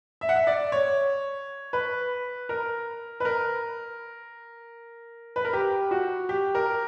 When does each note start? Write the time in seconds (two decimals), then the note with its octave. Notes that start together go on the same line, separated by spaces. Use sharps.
0.21 E5
0.29 F#5
0.36 E5
0.47 D5
0.72 C#5
1.73 B4
2.49 A#4
3.20 B4
3.25 A#4
5.36 B4
5.45 A#4
5.53 G4
5.91 F#4
6.29 G4
6.55 A#4